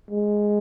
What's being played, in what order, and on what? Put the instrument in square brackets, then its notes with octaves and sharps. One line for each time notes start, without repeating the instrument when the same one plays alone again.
[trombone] G#3